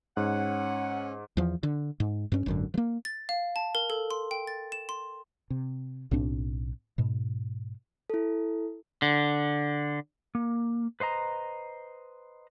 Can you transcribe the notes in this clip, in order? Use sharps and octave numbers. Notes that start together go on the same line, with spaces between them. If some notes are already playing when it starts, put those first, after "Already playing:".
G#2 C#4 F#5
E2 F3
D3
G#2
G2 C#4
G#1 F#2 D3
F3 A#3
A6
F5
A5
A#4
A4
C6
G5
A6
E7
C6
C3
B1 A2 C4 D4
G#2 B2
E4 A4
D3
A#3
B4 C5 D#5 A#5